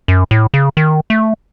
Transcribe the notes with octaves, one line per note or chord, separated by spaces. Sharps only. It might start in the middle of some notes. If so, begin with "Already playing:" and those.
F#2
A2
C#3
D#3
A3